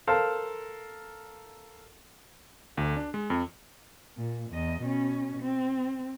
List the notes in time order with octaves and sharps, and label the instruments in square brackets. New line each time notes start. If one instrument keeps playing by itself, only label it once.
[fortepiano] A4 A#4 C5 F5 A5 A#5
[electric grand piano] D2
D4
G#3
F2
[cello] A#2
E2 D#5
B2 C#4
C4